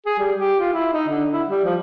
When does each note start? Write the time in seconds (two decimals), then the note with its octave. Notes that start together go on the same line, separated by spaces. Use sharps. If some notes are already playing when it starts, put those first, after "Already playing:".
0.06 G#4
0.19 G3
0.38 G4
0.60 F4
0.73 E4
0.93 D#4
1.08 D3
1.33 E4
1.49 G3
1.65 F3